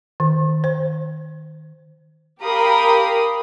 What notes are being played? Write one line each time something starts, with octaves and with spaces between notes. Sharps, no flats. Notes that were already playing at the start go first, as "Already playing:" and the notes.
D#3
C5
G4 A#4 F5 B5 D#6